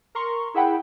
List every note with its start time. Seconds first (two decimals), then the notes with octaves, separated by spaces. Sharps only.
0.15 A#4 A#5 C6 C#6
0.54 E4 G#4 E5 F#5 G5 B5